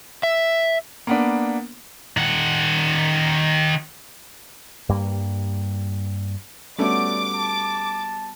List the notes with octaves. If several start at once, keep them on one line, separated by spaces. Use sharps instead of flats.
E5
A#3 B3 D4
D#3 F#5
G2 G3 A#3
G3 A3 B3 C#4 F#4 D5 D6
A5